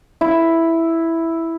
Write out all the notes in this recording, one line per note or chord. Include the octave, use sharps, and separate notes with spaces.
E4